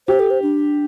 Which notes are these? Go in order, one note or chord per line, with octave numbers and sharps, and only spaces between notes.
G4 C5
A4
C5
D4